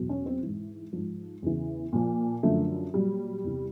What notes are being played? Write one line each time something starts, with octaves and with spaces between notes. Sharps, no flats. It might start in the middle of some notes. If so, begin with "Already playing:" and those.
Already playing: E2 B2 F#3
C#4
C4
G#2 E3
G#2 F3
E2 C#3 E3
A#2 F3
F#2 D3 F3 A3
A#2 F#3 G3
E2 C3 E3